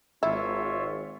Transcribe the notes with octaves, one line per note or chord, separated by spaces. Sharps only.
G#1 E4 F4 C#5 E5